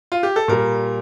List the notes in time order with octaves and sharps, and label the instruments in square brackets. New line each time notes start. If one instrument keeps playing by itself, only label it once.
[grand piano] F4
G4
A4
A#2 G3 A#4